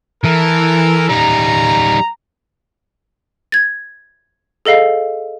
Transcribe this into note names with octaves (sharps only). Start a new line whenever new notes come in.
E3 A4 A#4
G3 D#4 A#5
G#6 A6
G#4 A4 D#5 F5